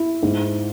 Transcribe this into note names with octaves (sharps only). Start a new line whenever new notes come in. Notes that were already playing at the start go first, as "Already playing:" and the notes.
Already playing: E4
G#2